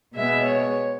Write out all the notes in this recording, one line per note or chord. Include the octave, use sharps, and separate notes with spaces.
B2 G#3 B3 E5
C#5